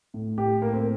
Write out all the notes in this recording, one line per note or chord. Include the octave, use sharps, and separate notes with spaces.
A2
A2 G4
A2 A#3
C4